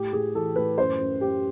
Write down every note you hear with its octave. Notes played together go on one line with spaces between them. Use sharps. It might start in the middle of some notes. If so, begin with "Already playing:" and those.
Already playing: A2 G4
A2 G#4
E3 A4
A2 B4
F#2 C5
F#2
F#2 G4